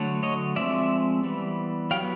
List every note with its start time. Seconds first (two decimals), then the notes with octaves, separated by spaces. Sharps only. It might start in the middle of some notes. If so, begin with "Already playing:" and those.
Already playing: D3 F#3 A3
0.23 C#5 D#5
0.56 F3 G#3 C4 D5 E5
1.24 E3 G3 B3
1.91 F#3 B3 F5 G5